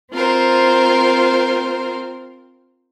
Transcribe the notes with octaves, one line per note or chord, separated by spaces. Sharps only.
C4 F4 A#4 C5